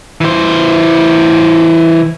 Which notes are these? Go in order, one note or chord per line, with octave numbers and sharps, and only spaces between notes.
E3 C5